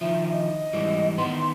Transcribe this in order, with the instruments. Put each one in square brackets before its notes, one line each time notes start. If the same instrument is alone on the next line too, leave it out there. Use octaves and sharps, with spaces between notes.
[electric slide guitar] D#3 F3 [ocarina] E5
[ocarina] D#5
[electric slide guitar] G#2 E3 G3
[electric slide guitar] D#3 B3 [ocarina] C6